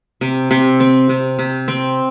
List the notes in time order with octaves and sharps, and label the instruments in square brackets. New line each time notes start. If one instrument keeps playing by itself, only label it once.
[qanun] C3
C3
C4
C3
C3
C4